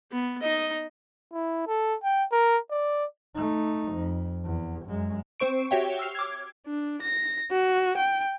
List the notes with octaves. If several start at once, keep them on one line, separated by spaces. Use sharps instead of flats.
B3
D#4 D#5
E4
A4
G5
A#4
D5
A3 D#4
F2
E2
F#2 G#3
C4 C5 C#6 D7
F#4 G4 C#5 E5 G5
E6 F6 C7 F7
D6 G#6
D4
A#6
F#4
G5